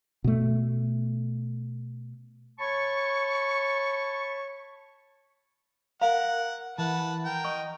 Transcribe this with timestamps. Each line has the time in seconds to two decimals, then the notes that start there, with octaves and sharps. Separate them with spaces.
0.24 B2 A3
2.59 C#5 A5 B5 C#6
6.02 A#4 F5 F#5 A#5
6.78 E3 B4 F#5 A5
7.25 A#4 G5
7.45 D#5 C#6